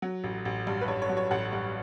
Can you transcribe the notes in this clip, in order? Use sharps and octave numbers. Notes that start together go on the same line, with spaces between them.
F#3
A1
A1
G2
B4
G2 C#5
C#5
F#3
C#5
A1 F#5
G2